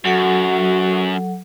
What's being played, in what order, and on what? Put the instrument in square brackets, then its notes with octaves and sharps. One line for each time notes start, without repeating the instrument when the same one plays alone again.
[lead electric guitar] F#2 [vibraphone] F#3 A4 F#5 [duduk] F#4